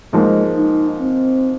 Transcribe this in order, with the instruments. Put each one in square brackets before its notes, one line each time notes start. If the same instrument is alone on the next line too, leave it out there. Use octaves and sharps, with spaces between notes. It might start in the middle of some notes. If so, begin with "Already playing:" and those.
[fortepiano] G#2 F3 A#3 [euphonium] G#3
[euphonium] D#4
C4